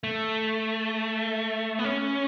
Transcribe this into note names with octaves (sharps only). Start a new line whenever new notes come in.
A3
B3
C#4